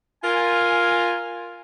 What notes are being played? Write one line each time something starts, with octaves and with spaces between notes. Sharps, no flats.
F4 A#4 G#5